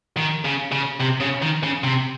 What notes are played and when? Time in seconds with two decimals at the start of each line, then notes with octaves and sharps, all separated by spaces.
0.17 D#3
0.45 C#3
0.72 C#3
1.00 C3
1.20 C#3
1.42 D#3
1.63 C#3
1.84 C3